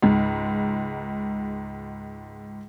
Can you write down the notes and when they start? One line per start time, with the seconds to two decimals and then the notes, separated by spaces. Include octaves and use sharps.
0.02 C#2 G#2